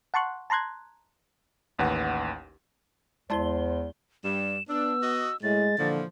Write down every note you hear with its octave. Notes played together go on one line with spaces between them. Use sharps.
F#5 A5 C6 C#6 F#6
A5 A#5 C6 F#6 G#6
A1 D#2 B4 F#5
E2 G#3 E4 C5 D5 A5 C6 G7
G2 G3 E7
B3 D4 E6
F#4 D#5
A2 G#3 A6
A#2 D3 E3 F3